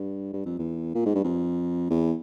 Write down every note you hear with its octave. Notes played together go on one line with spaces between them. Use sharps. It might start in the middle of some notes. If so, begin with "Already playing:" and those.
Already playing: G2
G2
F2
E2
A#2
G#2
G2
F2
E2